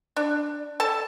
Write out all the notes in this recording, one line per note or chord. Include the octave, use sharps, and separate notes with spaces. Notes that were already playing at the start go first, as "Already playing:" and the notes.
D4
A4 A5